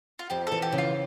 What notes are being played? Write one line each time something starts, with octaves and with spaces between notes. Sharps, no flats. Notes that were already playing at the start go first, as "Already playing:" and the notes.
F4
F2 G4
E3 A4
G4
C#3
F4